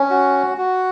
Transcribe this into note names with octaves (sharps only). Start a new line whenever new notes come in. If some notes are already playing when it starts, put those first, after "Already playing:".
Already playing: C#4
F#4
F#4